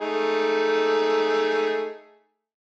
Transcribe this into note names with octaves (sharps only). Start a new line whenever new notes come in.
A3 D#4 G#4